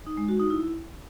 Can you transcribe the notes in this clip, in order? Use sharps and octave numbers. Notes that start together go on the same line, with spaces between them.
D#4
G#3
F#4
D#4
E4